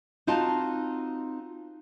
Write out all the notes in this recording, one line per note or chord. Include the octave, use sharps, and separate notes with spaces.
C4 D#4 F4 F#4 A5